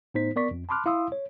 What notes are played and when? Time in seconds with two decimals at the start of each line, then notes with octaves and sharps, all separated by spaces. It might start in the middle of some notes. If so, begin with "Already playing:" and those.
0.14 A2 B3 D#4 C5 B6
0.36 B3 A#4 D5 C#6 B6
0.51 F2
0.69 A5 B5 C6 D6 F6 F#6
0.86 E4 F5 C6 D#6 E6
1.12 C#5